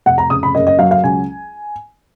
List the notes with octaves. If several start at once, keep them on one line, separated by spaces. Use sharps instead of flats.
F1 F#5
A#5
C#3 D#6
B5
F#1 D#5
D#5
F#3 F5
F5
C#2 G#5